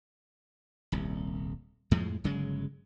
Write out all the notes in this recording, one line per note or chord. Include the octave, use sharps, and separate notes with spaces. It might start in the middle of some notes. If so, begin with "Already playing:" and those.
D#1 C2
F2 A2 F3 G#3
G1 C#3 F#3 G#3